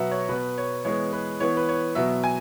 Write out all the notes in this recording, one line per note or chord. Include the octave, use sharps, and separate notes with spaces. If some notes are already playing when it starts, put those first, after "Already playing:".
Already playing: B2 F#3 B3 E5 F#5
C#5
B2 B3 B4
C#5
E3 G#3 B3 C#5
B4
E3 B3 C#5
B4
C#5
B2 F#3 B3 E5
G#5